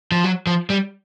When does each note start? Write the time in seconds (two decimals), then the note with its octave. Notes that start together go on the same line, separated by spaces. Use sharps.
0.12 F3
0.24 F#3
0.47 F3
0.70 G3